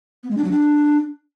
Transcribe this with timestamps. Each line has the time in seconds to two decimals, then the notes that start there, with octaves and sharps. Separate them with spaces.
0.24 B3
0.31 G#3
0.37 D4
0.44 F#3
0.51 D4